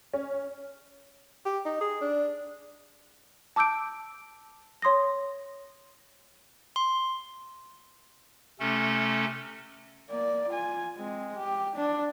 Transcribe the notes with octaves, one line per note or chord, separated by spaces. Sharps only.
C#4
G4
D#4
G#4
D4
A5 D6 E6 G6 D7
C#5 C6 D#6 A#6
C6
C3 A3 C#4 A4
A#3 D5
F4 G#5
G#3 C4
G4
D4